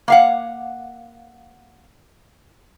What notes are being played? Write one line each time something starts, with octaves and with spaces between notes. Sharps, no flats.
A#3 F5 F#5